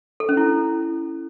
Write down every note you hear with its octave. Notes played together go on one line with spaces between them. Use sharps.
A4
C#4
E4